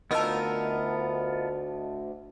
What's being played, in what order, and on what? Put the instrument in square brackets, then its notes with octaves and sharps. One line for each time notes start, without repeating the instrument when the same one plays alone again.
[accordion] D2 [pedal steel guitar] B3 F4 E6 [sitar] D#4 A#4 [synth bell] D#5 A5